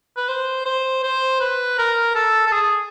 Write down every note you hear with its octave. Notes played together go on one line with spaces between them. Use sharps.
B4
C5
C5
C5
B4
A#4
A4
A4
G#4